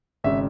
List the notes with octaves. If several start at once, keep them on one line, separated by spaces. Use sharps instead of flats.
G#1 C#3 E5